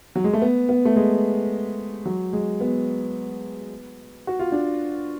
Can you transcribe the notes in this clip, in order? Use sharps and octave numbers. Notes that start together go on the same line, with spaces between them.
F#3
G#3
A3
B3
B3
A3
G#3
F#3
G#3
B3
F#4
F4
D4